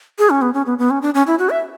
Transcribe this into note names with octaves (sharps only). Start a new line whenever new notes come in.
G#4
C#4
B3
C#4
B3
B3
C#4
D4
C#4
E4
F#4
E5